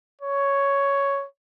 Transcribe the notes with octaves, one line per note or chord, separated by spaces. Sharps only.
C#5